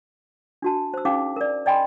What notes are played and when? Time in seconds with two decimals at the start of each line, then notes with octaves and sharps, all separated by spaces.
0.62 D4 F#4 A5
0.94 C5 E6
1.05 C#4 D#4 G#4 F5 D6
1.36 A#4 D5
1.66 D5 D#5 G5 G#5 B5 C6